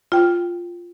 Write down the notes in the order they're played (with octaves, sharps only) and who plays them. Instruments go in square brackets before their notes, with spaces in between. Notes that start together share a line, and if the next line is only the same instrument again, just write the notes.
[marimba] F4 G5